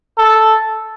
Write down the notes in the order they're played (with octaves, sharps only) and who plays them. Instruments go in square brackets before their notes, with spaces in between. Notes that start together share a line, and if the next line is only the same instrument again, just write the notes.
[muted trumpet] A4